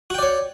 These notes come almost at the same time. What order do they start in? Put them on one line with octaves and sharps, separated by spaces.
F#4 G5 D5 C#5